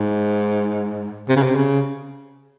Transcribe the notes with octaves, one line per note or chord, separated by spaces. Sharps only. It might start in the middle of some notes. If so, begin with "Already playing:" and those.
Already playing: G#2
C3
C#3
C3
C#3